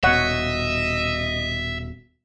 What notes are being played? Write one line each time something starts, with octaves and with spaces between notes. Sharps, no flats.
D#1 B2 C#5 D#5 E5 F#5